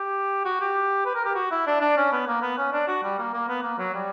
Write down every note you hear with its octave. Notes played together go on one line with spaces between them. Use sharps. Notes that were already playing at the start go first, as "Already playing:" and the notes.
Already playing: G4
F#4
G4
B4
A#4
G4
F#4
E4
D4
D4
C#4
B3
A#3
B3
C#4
D4
F#4
G3
A#3
A#3
B3
A#3
F#3
G3